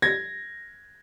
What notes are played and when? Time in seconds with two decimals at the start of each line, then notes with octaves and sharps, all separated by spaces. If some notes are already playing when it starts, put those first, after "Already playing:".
0.02 G#6 A#6